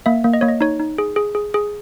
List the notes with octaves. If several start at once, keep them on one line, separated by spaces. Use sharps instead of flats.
A#3 E5
A#3
D#5
A#3 C#5
D#5
D#4 C#5
D#4
G#4
G#4
G#4
G#4